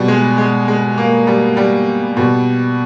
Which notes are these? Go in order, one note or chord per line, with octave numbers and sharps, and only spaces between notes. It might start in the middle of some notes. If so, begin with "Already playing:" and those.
Already playing: B2 G3
G#3
G#3
G#3
A#3
G3
G3
B2 G3